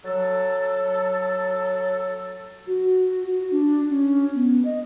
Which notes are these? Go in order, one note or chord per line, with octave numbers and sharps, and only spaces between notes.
F#3 A4
F#4
F#4
D4
C#4
B3
D#5